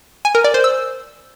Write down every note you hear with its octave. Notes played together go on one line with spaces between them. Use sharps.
G#5
A#4
D5
C5
E6